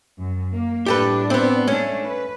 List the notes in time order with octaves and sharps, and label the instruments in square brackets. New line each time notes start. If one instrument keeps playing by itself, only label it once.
[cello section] F#2
A#3
[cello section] A2 G3 D4 [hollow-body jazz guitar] G4 A4 B4
[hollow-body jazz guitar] B3 C4
[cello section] A3 D4 [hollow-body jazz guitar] C#4
[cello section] B4